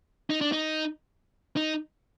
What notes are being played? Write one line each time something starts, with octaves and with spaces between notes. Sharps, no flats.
D#4
D4
D#4
D#4